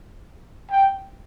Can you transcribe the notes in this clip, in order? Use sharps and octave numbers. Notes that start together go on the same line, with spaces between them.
G5